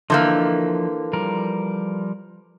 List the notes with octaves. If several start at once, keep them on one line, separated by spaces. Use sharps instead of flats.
D3 E3 F3 A#3 D#5 G6
F3 G3 A#4